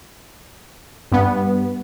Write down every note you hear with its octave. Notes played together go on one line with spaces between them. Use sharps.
G2 B3